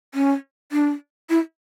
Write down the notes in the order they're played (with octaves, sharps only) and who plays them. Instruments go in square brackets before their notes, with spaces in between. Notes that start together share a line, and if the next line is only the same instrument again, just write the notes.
[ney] C#4
D4
E4